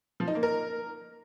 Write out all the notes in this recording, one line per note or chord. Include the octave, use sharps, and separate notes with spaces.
F3
D#4
A#3
A#4